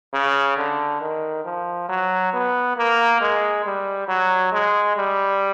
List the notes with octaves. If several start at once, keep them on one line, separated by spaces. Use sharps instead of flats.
C#3
D3
D#3
F3
F#3
B3
A#3
G#3
G3
F#3
G#3
G3